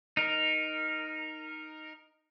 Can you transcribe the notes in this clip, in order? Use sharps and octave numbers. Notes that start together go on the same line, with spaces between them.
D#4 A#4